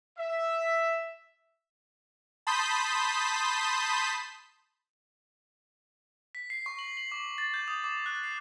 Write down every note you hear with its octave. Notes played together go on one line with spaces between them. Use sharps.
E5
A5 B5 C6 D#6 G6 B6
B6
C7
C#6
F#7
F#7
D6
A6
G6
D#6
D6
F#6
C7